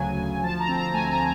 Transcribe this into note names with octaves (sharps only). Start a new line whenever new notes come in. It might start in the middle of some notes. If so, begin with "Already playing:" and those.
Already playing: D2 C#3 F#3 G#5
D2
F3 A5
A#5
C4
A#5
A3 G#5
A#5